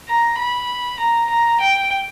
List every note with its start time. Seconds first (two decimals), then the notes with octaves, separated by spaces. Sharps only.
0.09 A#5
0.38 B5
1.00 A#5
1.30 A#5
1.60 G5